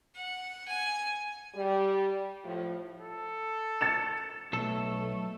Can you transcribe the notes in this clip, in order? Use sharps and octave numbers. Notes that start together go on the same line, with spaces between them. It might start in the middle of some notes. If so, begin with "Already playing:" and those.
F#5
G#5
G3
A2 F3
A4
A6 C#7 E7
B1 A3 A4